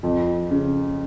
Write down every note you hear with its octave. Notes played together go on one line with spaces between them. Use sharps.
F2
C#3